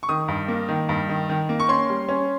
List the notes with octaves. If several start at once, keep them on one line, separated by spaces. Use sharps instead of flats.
C#6
D#3 D#6
G2
A#3
D#3
G2
D#3
D#3
A#3
C#6
C#4 C6
G3
C#4